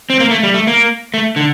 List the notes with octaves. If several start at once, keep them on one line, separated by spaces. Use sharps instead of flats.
C4
A#3
A3
G3
A3
A#3
A3
D3